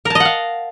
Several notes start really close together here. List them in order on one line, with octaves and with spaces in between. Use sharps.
A#4 A5 D#5 F#5 F5